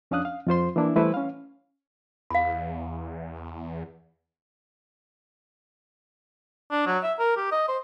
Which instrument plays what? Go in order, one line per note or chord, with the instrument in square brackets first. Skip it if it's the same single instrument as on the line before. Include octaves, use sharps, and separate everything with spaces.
[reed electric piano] F2 C#4 D4 F5 D#6 F#6
F5
F2 F4 C5 C6
E3 A#3 D4 E4
E3 G3 A3 E4 B4 C5
C#4 F5
[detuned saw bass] E2 [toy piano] F5 B5
[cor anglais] D4
F#3
E5
A#4
G4
D#5
C5